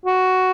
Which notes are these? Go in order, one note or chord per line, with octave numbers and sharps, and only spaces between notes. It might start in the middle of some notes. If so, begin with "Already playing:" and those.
F#4